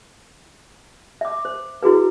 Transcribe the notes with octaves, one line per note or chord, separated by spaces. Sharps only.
E5 D6
C5
E4 F#4 G#4 B4